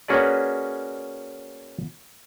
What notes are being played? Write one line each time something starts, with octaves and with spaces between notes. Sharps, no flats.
A#3 C#4 F#4 G#4 B4 D5